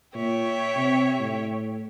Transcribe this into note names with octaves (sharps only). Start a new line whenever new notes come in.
A#2 C#5 E5 G5
C3
A2